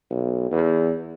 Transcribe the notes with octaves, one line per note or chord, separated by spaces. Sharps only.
B1
E2